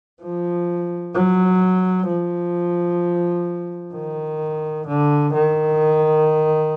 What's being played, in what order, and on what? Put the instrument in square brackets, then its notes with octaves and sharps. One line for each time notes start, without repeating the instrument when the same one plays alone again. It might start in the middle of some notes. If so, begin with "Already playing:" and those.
[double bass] F3
F#3
F3
D#3
D3
D#3